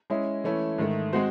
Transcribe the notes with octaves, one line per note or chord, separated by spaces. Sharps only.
G#3 C#4 E4
E3 A3 C#4 E4
G#2 D#3 A3
G#3 C4 F#4 C5